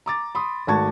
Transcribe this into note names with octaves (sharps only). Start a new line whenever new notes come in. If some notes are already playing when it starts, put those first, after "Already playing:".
A#5 D6 A6
B5 C6 D#6
G#1 A3 F#4 A5 C#6 G#6